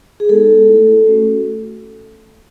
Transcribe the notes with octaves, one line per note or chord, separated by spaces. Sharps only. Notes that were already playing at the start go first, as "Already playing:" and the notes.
G#4
G#3 B3 D#4 A4
A3 E4
A3 C#4 F#4